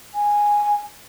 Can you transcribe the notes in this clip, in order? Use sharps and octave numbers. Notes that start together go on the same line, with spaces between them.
G#5